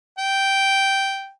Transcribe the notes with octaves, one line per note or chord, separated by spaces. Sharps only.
G5